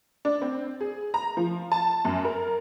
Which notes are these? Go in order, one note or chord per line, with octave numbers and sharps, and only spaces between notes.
D4
C4
G#4
A#5
F3
A5
F#2
A#4